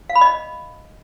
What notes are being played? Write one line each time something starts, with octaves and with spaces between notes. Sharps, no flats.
F5
B5
D#5